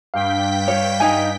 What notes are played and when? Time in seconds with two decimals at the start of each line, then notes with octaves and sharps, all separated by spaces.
0.14 G2 F5 G5 B6
0.68 C#5 F5
1.00 D#4 G#5